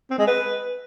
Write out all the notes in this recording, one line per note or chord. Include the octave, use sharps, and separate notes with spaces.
C4
G#3
B4